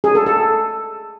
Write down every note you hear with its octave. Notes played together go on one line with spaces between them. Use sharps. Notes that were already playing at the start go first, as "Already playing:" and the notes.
G#4
A4
A4